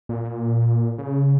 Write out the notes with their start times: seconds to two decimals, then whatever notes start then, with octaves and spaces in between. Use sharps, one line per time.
0.09 A#2
0.98 C#3